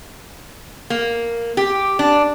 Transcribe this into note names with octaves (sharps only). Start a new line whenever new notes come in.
A#3
G4
D4